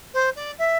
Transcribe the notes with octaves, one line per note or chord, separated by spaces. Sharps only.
C5
D5
E5